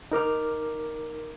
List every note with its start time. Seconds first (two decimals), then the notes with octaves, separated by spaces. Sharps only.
0.12 D#4 A#4 D6 F6